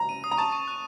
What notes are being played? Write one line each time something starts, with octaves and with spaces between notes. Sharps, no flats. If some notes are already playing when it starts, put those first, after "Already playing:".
Already playing: A#5
D#7
D#6
A#5
A5 C#6
C#6
F#6